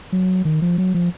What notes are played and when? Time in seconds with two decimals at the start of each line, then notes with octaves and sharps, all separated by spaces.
0.12 F#3
0.45 D#3
0.62 F3
0.78 F#3
0.94 F3